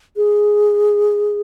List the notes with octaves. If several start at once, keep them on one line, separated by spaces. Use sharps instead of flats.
G#4